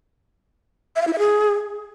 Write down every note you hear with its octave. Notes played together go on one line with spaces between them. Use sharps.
E5
F5
E4
E5
G#4